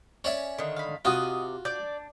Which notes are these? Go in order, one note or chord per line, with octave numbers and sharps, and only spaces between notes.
C#4 C#5 D5 E5
D3 D#3
F5 B5
C3 F4 F#4 D#5 F#5 D#6
D4 D5 G6